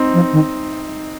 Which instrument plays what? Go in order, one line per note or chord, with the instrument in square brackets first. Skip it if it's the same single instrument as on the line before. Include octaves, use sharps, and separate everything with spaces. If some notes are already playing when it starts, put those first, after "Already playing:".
Already playing: [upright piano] C4 D#4
[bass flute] F3
D#3